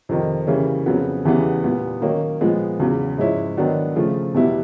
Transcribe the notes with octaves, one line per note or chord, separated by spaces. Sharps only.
F2 C3 D#3
C#3 E3 G3 A#3 C#4
F2 C#3 F#3 B3
E2 C#3 E3 G3 B3
A#2 G3 B3
D#3 F#3 A#3 C#4
A#2 F3 G#3 B3
E2 C#3 F#3
G#2 F3 G#3 C#4 E4
D#3 F#3 B3 D4
C#3 F3 A3
E2 B2 G3 B3 E4